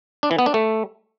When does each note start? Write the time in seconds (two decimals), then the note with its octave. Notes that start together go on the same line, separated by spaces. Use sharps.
0.23 D4
0.31 E3
0.39 B3
0.46 D4
0.54 A3